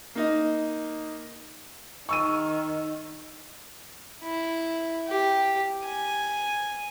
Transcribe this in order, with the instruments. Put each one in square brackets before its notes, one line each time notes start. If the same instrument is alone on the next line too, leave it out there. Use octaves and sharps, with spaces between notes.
[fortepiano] A#3 D#4 D#5
[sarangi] D#3 [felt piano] C#6 E6 D#7
[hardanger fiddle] E4
G4
G#5